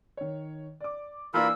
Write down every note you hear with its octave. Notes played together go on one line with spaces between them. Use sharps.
D#3 C#5
D5 D6
E3 A#3 D4 F4 A#4 B5 E6 F#6